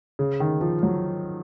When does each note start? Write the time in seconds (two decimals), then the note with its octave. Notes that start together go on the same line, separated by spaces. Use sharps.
0.19 C#3
0.40 D#3
0.61 F3
0.83 F#3